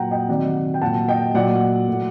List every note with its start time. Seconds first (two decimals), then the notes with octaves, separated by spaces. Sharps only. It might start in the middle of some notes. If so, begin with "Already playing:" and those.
Already playing: A#2 F#3 F#5 G5 A#5
0.11 D#5 G5
0.29 C3 D#3 F#3 D5 F#5
0.74 G5
0.82 A#2 F#3 F#5 A5
1.08 D#5 G5
1.34 A#2 F#3 D5 F#5
1.87 A2 F#3